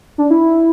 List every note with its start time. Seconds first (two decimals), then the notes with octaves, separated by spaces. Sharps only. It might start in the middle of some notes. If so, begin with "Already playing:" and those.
0.18 D4
0.31 E4